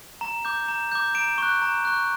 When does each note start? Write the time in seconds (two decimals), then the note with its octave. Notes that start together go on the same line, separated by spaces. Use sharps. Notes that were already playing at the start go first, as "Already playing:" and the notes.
0.21 A#5
0.45 D6 G6
0.68 A#5
0.92 D6 G6
1.15 A#5 D7
1.38 C#6 F#6
1.62 A#5
1.85 C#6 F#6